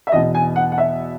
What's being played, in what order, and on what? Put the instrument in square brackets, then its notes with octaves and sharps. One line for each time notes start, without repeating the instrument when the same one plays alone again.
[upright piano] E5
E2 B2 D#5
G#5
F#5
F#5
E5